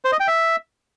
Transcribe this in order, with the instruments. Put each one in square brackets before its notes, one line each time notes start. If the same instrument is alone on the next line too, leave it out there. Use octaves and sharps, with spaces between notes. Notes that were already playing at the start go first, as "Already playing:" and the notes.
[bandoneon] C5
D#5
G5
E5